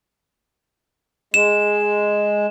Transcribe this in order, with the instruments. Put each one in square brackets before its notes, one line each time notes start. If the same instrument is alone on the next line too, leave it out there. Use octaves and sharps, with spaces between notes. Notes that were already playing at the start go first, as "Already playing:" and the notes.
[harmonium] G#3 [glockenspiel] E7